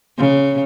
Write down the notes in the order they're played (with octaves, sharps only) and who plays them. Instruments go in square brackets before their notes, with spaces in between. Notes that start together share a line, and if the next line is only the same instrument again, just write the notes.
[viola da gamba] C#3